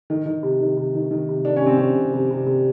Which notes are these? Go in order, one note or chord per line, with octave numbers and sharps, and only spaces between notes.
D#3
D#3
C3
D#3
C3
D#3
D#3
C3
D#3 D4
C#4
C3
C4
C3 C#4
C3
C3
C3
C3